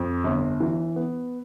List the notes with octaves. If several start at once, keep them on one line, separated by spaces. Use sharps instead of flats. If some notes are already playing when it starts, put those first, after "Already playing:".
Already playing: F2
G1
E3
B3